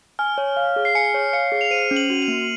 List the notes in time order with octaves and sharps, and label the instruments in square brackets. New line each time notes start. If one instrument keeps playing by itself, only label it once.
[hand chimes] G#5 [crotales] F6
[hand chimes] C#5
F5
G#4
[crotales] C7
[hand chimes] G#5 [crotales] C#7
[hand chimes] C#5
[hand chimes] F5 [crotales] C#7
[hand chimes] G#4
[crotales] F7
[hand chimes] C5 [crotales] D#7
[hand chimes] C#4
[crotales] F#7
[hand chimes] F#4
[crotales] F7
[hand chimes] A#3